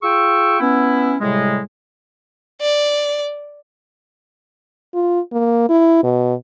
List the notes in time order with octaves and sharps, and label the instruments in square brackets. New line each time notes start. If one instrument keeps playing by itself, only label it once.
[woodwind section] F4 G#4 G5 C#6 E6
B3 C#4 E4
A2 C3 G3 G#3
[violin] D5
[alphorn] F4
A#3
E4
B2